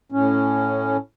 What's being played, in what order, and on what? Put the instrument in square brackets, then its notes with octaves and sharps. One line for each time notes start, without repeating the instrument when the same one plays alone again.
[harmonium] A2 C#4